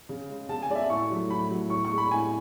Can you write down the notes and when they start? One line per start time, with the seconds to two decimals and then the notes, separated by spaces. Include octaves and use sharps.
0.09 C#3
0.29 G#3
0.49 C#3 A5
0.62 G#5
0.69 G#3 D5
0.75 E5
0.90 A2 C#6
1.10 F#3 A3
1.30 A2 B5
1.50 F#3 A3
1.70 A2 C#6
1.85 C#6
1.91 G#3
1.98 B5
2.11 A2 G#5